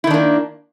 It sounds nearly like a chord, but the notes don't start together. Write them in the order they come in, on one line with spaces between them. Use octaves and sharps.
E4 D#3 D4 A#3